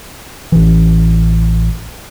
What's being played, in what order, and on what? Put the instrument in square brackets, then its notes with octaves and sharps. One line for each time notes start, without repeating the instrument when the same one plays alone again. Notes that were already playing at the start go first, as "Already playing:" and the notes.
[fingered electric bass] A1 E3